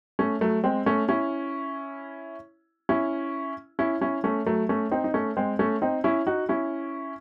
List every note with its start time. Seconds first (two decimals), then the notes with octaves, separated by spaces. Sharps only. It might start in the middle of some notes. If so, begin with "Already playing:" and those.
0.19 A3 C#4
0.41 F#3 A3
0.64 G#3 C4
0.86 A3 C#4
1.09 C#4 E4
2.89 C#4 E4
3.79 C#4 E4
4.01 C#4 E4
4.24 A3 C#4
4.46 F#3 A3
4.69 A3 C#4
4.91 C4 D#4
5.04 D#4
5.14 A3 C#4
5.37 G#3 C4
5.59 A3 C#4
5.82 C4 D#4
6.04 C#4 E4
6.27 D#4 F#4
6.49 C#4 E4